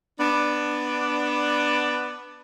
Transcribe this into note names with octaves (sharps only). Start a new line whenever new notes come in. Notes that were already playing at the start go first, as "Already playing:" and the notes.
B3 D4